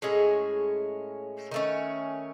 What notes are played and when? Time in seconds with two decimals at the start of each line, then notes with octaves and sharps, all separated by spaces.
0.02 A2 G#3 C#4 G#4
1.51 D#3 A3 C#4